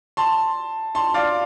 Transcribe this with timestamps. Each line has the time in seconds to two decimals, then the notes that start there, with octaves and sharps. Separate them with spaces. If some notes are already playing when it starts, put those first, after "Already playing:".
0.17 A5 C6
0.95 A5 C6
1.14 D5 F5